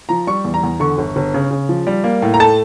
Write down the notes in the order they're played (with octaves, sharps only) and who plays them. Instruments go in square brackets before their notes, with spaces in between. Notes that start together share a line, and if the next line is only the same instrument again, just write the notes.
[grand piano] F3 A#5
G3 C#6
E2
A#5
E2
D3 C#6
G1
G1
C#3
C#3
F3
G3
A#3
A2
A#5
A3 A5